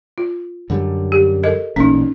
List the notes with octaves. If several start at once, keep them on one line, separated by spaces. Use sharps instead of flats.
F4
F#2 D3 G3
G4
A4 A#4 D#5
A1 A#2 C#4 D#4